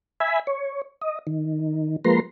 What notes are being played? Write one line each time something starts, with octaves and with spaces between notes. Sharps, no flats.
E5 G#5 B5
C#5
D#5
D#3
F3 G#3 A#3 B4 A#5 C6